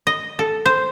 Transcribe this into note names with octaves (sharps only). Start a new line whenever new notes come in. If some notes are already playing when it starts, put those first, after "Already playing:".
D#5
A4
C5